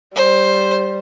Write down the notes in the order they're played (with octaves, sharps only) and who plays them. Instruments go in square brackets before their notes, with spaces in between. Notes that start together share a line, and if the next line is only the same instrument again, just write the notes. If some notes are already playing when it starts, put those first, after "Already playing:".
[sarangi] G3 [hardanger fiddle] C5